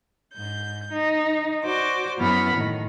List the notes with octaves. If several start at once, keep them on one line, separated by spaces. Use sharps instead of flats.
G#2 G6
D#4
F#4 C5 D5 D6
F#2 B3 E4 F#5 B5 F6
A2 D#3